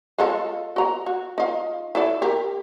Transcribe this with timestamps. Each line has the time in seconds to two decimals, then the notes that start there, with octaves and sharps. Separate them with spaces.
0.18 G#3 F4 A4
0.76 F#4 A#5
1.06 F#4
1.38 D#4 F4
1.95 E4 A4 D5
2.22 G4 A#4